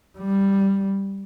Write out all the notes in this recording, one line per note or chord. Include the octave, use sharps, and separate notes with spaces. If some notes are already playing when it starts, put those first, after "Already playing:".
G3